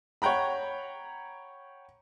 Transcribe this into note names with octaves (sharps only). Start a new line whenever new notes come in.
C#5 F#5 G5 A#5 B5